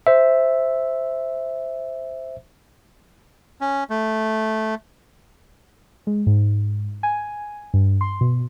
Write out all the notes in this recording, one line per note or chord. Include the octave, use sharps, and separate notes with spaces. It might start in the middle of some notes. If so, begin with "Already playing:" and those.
C5 E5
C#4
A3
G#3
G#2
G#5
G2
C6
B2